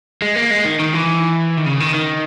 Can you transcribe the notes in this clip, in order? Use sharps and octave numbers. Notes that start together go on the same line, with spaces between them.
G#3
A#3
G#3
D#3
D#3
E3
D#3
C#3
D#3
D#3